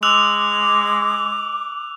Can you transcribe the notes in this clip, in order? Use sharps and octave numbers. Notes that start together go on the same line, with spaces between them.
G#3 D6 E6 F#6 F7